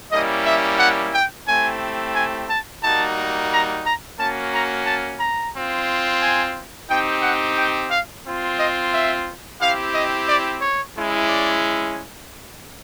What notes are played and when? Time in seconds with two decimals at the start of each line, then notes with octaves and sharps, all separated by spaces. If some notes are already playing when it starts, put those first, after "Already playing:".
0.12 G3 A#3 C#4 E4 D#5
0.46 E5
0.79 F#5
1.14 G5
1.48 A3 C4 E4 G4 G#5
2.15 G#5
2.49 A5
2.83 G3 A#3 D#4 F#4 A5
3.51 A#5
3.84 A#5
4.18 A#3 C#4 F#4 A5
4.52 A#5
4.85 A5
5.20 A#5
5.54 C4 F4
6.22 G#5
6.89 C4 D#4 G4 G5
7.22 F#5
7.57 G5
7.91 F5
8.25 C4 F4
8.59 D#5
8.92 E5
9.60 C4 E4 G4 F5
9.94 D#5
10.27 D5
10.61 C#5
10.95 G#3 C#4 E4
11.29 D5